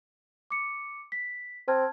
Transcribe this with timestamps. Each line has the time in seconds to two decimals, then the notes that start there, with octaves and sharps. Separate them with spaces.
0.50 D6 C#7
1.12 B6
1.68 C4 A5 F6 G#6